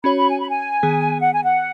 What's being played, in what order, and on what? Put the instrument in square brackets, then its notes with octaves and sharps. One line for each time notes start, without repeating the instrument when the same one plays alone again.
[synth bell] C#4 F#4 C#5 [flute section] B5
[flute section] B5
G#5
B5
G#5
[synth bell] D#3 B3 G#4
[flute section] F#5
G#5
F#5